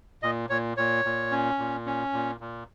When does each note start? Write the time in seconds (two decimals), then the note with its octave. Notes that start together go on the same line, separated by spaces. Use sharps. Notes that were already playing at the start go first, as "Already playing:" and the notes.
0.23 A#2 D#5
0.50 A#2 C#5
0.77 A#2 C#5
1.05 A#2
1.31 C#4
1.59 A#2
1.86 C#4
2.13 A#2
2.40 A#2